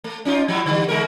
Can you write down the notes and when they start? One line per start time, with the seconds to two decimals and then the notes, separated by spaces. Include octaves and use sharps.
0.04 A3
0.25 C#4 D#4 F4
0.48 F3 G3 E4
0.66 D3 G3
0.88 D3 G#3 A#4